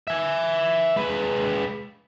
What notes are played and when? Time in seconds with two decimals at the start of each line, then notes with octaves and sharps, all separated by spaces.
0.08 E5 G#5
0.96 G#3 B4